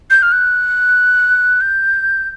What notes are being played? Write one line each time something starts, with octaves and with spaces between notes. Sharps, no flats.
G6
F6
F#6
G6